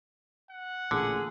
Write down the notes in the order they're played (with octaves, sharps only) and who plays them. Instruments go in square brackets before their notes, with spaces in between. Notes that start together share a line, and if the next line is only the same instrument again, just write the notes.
[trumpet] F#5
[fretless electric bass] A1 A#2 [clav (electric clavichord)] D3 [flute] G#4